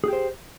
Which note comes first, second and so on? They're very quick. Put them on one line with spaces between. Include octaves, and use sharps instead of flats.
G#4 G4 C5